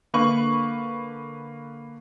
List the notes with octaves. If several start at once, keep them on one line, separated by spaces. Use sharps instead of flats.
D3 A#3 B4 C#6 F#7